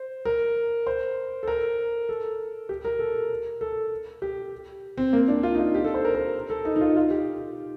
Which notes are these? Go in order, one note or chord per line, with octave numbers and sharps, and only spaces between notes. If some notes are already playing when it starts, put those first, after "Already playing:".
Already playing: C5
A#4
C5
A4
A#4
A4
G4
A#4
A4
A4
G4
C4
A#3
D4
F4
D#4
F4
G4
A4
C5
A#4
A#4
A4
D#4
D#4
F4
F4
G4